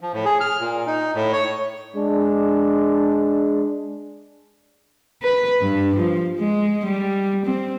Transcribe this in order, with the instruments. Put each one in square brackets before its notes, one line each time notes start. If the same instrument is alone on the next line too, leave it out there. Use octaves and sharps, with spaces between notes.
[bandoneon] F3
A2
G#4
F6
A#2
D#4
A2
C#5
[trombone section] G#3 D4
[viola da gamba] B4
G2
F3
G#3
G3
C4